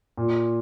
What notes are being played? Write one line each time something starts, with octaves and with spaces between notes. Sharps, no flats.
A#2